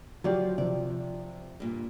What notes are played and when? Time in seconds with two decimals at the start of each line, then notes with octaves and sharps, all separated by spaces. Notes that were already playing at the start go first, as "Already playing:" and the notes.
0.24 F3 F#3 F4 G4 D5
0.58 C3 F3 D5
1.60 G2 A#2